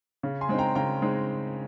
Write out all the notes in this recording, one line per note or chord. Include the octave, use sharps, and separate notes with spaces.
C#3
G#5 C6
G#3 C4 D#4
G5 A#5
C#3 G5 A#5
G#3 C4 D#4